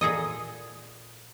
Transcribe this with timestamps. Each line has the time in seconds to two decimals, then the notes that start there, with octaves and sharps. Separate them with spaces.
0.01 A#2 G#4 A4 D#5